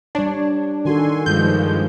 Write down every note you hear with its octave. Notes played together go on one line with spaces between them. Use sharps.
G3 D4 C#5
D#3 F#4 A4 G#5 C6
G2 D#3 F3 G#3 G6